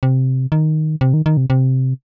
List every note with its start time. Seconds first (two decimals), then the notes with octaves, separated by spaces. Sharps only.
0.03 C3
0.52 D#3
1.01 C3
1.14 D#3
1.26 D#3
1.37 C3
1.50 C3